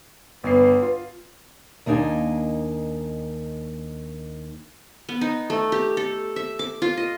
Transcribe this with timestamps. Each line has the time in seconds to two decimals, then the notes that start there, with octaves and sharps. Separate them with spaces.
0.44 G1 B3 B4 C7
0.82 F4
1.86 D#2 A#3 D4 D#4 G#5
5.09 B3
5.21 D#4
5.50 A3
5.72 G4
5.97 A4
6.36 E5
6.59 D6
6.82 F4
6.97 D#5